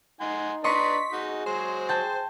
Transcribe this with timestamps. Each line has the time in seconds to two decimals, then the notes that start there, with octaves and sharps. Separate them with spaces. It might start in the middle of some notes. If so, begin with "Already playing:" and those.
0.21 D#4 F#5 G#5 C6
0.64 D4 B4 D#5 A#5 C6 C#6 B6
1.13 D#4 F#4 G#4
1.46 F#3 G#3 C5
1.89 G5 A5